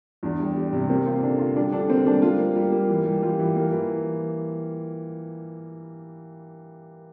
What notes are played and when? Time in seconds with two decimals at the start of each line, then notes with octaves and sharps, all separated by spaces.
0.23 E2 D4
0.40 G3
0.56 G3
0.73 C3
0.89 A#3 C4
1.06 C4 F4
1.22 D3 D4
1.39 F4
1.56 G3 D4
1.72 D3 D4
1.89 A#3 C4
2.05 G3 D4
2.22 A#3 F4
2.39 A#3
2.56 G3
2.72 A#3
2.89 E3
3.06 G3
3.22 G3 F4
3.39 E3
3.56 A#3
3.72 E3